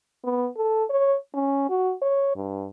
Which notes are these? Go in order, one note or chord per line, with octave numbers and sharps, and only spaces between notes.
B3
A4
C#5
C#4
F#4
C#5
G2